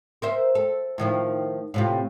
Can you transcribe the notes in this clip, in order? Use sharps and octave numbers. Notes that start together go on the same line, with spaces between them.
A#4 C5 E5
A4
A2 D#3 F3
A2 C3 F4